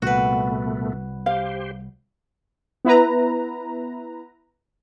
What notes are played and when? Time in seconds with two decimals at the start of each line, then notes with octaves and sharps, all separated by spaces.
0.02 C2 A#2 A3 B3 F#4 B4
1.26 G4 C5 F5
2.85 B3 E4 B4 A#5